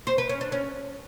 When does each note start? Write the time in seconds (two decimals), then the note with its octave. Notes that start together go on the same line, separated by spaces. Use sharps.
0.07 C5
0.18 B4
0.29 C#4
0.41 D4
0.52 C#4